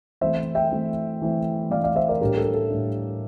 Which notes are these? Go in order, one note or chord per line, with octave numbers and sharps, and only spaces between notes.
E3 A3 C4 E4 C5 E5
E5 G5
E3 A3 C4 E4
E3 A3 C4 E4
E3 A3 C4 E4 D5 F5
D5 F5
C5 E5
A#4 D5
A2 G3 D4 G4 A#4
A4
A4
A2 G3 D4